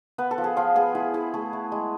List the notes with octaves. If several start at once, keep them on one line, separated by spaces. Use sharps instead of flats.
B3 B4
A4
F3
G#4
F3 F4
B3 G#4
E4 G#4
E4 G#4
A3 G#4
A3
G#3